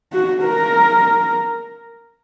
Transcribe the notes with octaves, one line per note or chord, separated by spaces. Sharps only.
F#4
A#4